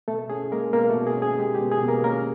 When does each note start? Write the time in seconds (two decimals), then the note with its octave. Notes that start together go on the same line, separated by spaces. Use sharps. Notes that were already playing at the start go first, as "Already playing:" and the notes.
0.08 B2 A3 A4
0.30 C#4 G#4
0.52 G#3 A#3 A#4
0.73 B2 A#3 A#4
0.90 A3 A4
0.96 B2
1.07 G#4
1.17 C#4
1.22 G#4
1.39 G#3 G4
1.55 G4
1.61 B2
1.71 G#4
1.83 B2
1.88 A#3 A#4
2.04 A#3 C#4 A#4